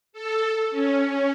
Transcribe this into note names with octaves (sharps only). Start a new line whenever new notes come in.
A4
C#4